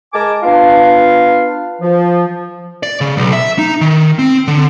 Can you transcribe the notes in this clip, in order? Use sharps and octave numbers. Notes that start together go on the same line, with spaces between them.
G#3 A#4 G#5 A5 D6
B3 D4 F4 F5
F3
D5
C#3
B1
E5
D#4
D#3
C4
D3